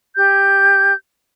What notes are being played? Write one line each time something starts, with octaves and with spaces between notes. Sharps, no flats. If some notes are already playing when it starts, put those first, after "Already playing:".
G4 G6